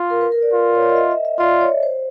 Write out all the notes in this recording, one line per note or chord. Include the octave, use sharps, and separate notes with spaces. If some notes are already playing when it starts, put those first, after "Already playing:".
Already playing: F4
A#4
B4
A#4
D5
F4
C#5
D5
D#5
E5
E5
E5
F4 D5
C#5
C5